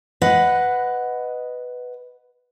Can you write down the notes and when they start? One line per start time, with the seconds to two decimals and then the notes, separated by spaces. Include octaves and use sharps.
0.22 B4 D#5 F#5